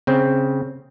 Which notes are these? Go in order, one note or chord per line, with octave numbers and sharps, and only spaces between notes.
C#3 C4